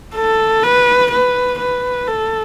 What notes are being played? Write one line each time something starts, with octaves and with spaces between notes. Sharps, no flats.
A4
B4
B4
B4
A4